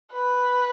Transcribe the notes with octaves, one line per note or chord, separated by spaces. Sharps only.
B4